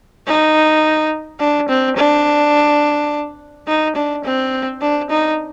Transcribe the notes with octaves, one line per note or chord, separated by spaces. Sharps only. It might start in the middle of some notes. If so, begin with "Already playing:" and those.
D#4
D4
C4
D4
D#4
D4
C4
D4
D#4